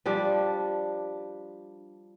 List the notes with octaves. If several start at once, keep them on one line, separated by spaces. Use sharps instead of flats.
F3 G3 D4